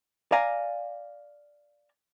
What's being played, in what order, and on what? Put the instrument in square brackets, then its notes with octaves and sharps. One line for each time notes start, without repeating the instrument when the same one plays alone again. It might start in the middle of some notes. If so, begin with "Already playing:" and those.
[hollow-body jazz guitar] D5 F5 G#5 A#5